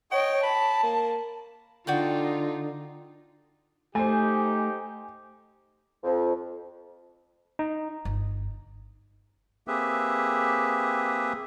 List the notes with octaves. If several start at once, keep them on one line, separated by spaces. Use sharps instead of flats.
C#5 D#5 G5
A5 B5
A#3
D3 D#4 F4 F#4 D5 G5
A3 D#4 G4 C5 G#5
F2
D#4
G1
A#3 C4 G4 G#4 B4 E5